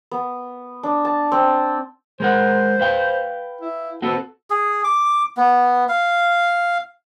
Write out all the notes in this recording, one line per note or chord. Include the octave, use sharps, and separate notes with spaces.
B3
D4
A5
C4
G#3 A#4 C5 F#5
B4 F5 G5
E4
B3 C4 F#4 A4
G#4
D6
B3
F5